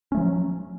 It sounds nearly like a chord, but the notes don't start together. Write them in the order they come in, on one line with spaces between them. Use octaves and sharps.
C#4 A3 F3 F#3